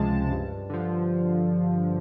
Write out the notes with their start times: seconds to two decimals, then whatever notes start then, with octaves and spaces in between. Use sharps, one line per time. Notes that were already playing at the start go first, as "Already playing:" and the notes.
Already playing: C#2 C3 F3 G#3 A5
0.31 G2
0.70 D3 F3